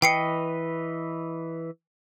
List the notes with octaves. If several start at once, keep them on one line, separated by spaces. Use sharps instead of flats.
E3 B4 D#5 G5 C7 C#7